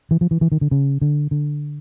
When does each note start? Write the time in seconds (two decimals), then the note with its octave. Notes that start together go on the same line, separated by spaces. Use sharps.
0.11 E3
0.21 F3
0.31 E3
0.41 E3
0.52 D#3
0.61 D3
0.71 C#3
1.02 D3
1.31 D3